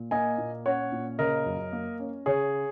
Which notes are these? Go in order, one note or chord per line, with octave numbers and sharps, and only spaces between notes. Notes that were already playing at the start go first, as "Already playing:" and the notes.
Already playing: A#2
A#3 D#5 G#5
A#2
C#4 C#5 F#5
A#2
C#3 A#4 D#5
F#2
A#3
C#4
C#3 G#4 C#5